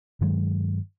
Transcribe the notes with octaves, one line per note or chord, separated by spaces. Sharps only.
G2 D#3 F#3 G#3